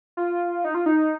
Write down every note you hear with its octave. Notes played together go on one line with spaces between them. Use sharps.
F4
D#4
F4
D#4